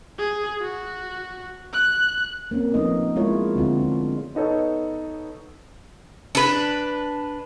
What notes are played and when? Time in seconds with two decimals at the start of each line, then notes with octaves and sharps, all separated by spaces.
0.18 G#4
0.61 F#4
1.73 F#6
2.51 A#3 C4 C#4
2.74 F3 A3 B3 D#4 D#5
3.16 G#3 B3 E4 F4 A#4 C#5
3.55 D3 C4 F4 F#4
3.79 D4
4.35 B3 D#4 A4 C#5
6.35 D4 B4